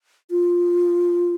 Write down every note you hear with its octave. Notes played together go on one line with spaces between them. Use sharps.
F4